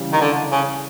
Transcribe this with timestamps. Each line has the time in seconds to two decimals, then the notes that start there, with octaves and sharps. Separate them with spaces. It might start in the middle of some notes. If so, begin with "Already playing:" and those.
Already playing: C#3 E3 G3
0.12 D#3
0.21 D3
0.51 C#3